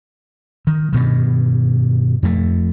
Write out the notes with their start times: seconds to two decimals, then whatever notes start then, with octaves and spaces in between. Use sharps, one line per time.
0.67 D#3
0.93 G2 B2 D#3
2.23 F2 A3